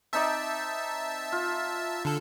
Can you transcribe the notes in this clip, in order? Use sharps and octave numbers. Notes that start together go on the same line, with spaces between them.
C4 D#4 D5 E5 A5
F4
D3 A4